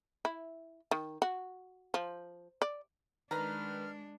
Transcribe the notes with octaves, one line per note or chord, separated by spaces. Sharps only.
E4
D#3
F#4
F3
D5
D#3 G#3 D4 B4 A#5 F6